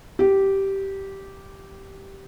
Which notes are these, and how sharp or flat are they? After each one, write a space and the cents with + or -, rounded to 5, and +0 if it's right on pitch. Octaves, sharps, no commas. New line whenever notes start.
G4 -10